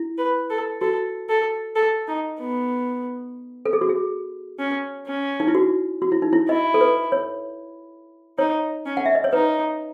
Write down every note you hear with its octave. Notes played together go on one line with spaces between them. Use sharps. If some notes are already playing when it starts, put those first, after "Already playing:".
Already playing: E4
B4
A4
F#4 A4
A4
A4
D#4
B3
A4
G#4
F#4
G#4
C#4
C#4
D#4
E4
F#4
F#4
E4
D#4
E4
E4 D#5
A4
B4
C#5
D#4 C#5
C#4
F#5
E5
D#5
C#5
D#4 B4